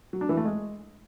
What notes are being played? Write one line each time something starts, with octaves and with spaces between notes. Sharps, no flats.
F#3
D4
E3
A3
G#3